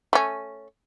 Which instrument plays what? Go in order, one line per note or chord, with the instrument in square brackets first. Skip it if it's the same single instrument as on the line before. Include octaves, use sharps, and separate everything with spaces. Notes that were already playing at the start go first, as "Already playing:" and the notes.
[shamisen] A3 C#4